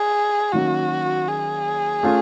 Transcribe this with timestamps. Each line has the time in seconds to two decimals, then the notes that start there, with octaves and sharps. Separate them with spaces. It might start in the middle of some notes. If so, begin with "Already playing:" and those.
Already playing: G#4
0.53 D#3 F#3 A#3 C#4 F#4
1.28 G#4
2.03 A3 C#4 F4